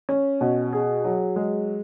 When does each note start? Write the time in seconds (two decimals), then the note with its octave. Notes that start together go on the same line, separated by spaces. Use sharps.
0.09 C#4
0.41 B2
0.73 G#4
1.04 F#3
1.36 G#3